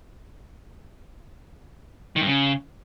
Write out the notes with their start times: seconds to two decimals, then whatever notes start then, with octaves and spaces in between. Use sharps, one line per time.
2.16 D#3
2.22 G2
2.27 C#3